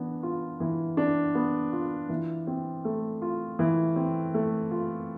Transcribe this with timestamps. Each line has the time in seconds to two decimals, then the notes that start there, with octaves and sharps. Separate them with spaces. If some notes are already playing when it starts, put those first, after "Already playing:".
Already playing: E3 B3 D4
0.23 F4
0.60 E3
0.97 D4
1.35 B3
1.72 F4
2.09 E3
2.47 C4
2.84 A3
3.22 F4
3.59 E3
3.96 C4
4.34 A3
4.71 F4